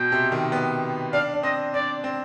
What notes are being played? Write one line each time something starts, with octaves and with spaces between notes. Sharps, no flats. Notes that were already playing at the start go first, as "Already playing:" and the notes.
Already playing: B2 G5
C3
D#3
B3
D4 F5
D4
C4 D#5
D4 D5
C4